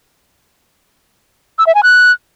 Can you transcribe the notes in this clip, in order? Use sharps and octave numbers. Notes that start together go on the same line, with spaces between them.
E6
E5
G#5
F#6